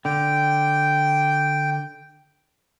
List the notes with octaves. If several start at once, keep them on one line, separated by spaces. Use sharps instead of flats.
D3 G5